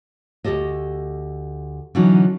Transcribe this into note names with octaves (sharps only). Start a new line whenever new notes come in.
D2 A#2 G4 A4 D#5
D3 E3 F#3 C#4 D#4